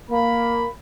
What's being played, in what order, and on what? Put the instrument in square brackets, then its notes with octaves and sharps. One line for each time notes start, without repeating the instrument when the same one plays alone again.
[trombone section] A#3 [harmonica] B5